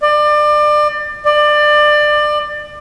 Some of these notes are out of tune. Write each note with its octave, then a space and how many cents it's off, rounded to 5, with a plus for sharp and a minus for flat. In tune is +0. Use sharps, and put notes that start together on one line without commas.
D5 +30
D5 +25